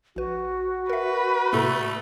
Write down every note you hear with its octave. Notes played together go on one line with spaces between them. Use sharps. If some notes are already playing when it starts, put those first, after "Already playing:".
A#1 F#4 B4
A#4 B4 E5
A2 C3 A3 A#3